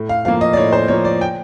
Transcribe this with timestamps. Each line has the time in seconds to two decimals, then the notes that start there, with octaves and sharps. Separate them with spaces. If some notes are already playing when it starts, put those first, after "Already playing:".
Already playing: A2
0.09 F5
0.25 F3 A#3 F5
0.41 D#5
0.53 D5
0.57 A2 C#5
0.73 C5
0.88 F3 A#3 C#5
1.05 D5
1.21 G5